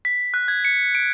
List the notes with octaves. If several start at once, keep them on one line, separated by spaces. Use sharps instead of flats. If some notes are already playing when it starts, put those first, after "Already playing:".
B6
F#6
G#6
C#7
D7